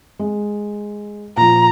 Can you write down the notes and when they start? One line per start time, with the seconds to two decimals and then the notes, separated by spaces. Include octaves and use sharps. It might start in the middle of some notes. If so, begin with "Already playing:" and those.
0.19 G#3
1.37 A#2 F3 A#5